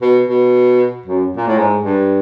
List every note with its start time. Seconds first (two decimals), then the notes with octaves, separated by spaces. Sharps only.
0.02 B2
0.28 B2
1.05 F#2
1.36 A#2
1.47 A2
1.58 G#2
1.83 G2